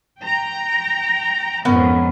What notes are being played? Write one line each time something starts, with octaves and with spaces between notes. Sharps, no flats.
G5 A#5
F2 G#2 B3 C#4 A#4